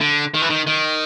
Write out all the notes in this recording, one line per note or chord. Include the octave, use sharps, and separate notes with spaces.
D3
D#3
E3
D#3
D#3